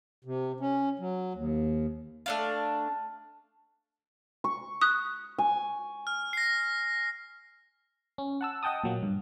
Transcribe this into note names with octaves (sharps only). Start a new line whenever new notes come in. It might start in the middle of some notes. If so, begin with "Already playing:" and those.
C3
C#4
F#3
D#2
A3 D4 F5
C#6
D#6 F#6
G#5
F6
A#6 C7
C#4
F#5 A5 E6
D#5 F#5 G5 A5 D#6
A#2 F#3 A#3
G2